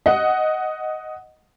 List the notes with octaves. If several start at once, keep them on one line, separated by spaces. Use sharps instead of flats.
D#5 F#5